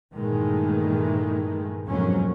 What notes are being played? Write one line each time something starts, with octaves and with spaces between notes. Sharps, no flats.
G2 A#2 D#3 E3 G#3 A3
F2 G#2 B2 F#3 A#3 C#4